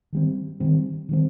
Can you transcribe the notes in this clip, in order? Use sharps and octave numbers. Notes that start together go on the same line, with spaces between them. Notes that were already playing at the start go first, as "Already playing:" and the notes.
D#3 G3 C4
D#3 G3 C4
D#3 G3 C4